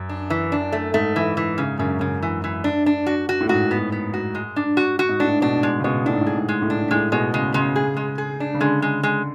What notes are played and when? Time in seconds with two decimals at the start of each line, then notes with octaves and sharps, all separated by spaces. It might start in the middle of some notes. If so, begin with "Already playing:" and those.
Already playing: F#2
0.09 D4
0.30 E3
0.52 D4
0.72 A3
0.94 G#2 A3
1.16 E3
1.37 E3
1.58 C#3
1.79 F#2 C#3
2.00 F#2 C#3
2.22 E3
2.44 E3
2.64 D4
2.86 D4
3.06 F#4
3.29 F#4
3.41 A2
3.49 G#2 F#4
3.71 B3
3.92 B3
4.14 F#4
4.35 G#3
4.56 D4
4.77 F#4
4.99 F#4
5.09 G#2
5.20 A2 D4
5.42 B2 D4
5.63 G#3
5.79 C#3
5.84 B2 G#3
6.05 A2 D4
6.13 G#2
6.21 A2
6.26 G#4
6.34 G#2
6.49 G#3
6.62 A2
6.70 D4
6.91 A2 G#3
7.12 B2 G#3
7.34 C#3 G#3
7.54 C#3 G#3
7.76 G#4
7.97 G#3
8.18 G#4
8.40 D4
8.54 C#3
8.61 D3 G#3
8.82 G#3
9.03 G#3